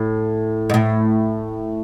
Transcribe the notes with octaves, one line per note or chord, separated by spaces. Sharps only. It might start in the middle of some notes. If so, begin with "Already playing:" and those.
Already playing: A2
G#2
A2